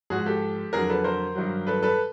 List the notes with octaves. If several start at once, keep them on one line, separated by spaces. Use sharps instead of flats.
G#2 F3 F#4 G#4
G4 A4
F2 D3 F#3 G#4 A#4
A4 B4
A#4 C5
G2 D#3 F#3
A4 B4
A4 B4